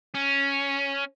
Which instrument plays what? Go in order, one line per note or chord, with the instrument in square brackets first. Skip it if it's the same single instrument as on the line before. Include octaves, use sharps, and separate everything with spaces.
[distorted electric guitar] C#4